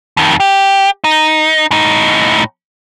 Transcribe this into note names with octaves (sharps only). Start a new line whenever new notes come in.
F2 D#3
G4
D#4
A2 D#4